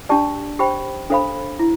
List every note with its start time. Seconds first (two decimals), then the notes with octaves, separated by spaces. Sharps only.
0.09 D4 G4 D5 A5
0.59 G4 C5 G5 B5
1.10 D4 A4 C5 F5 B5
1.59 E4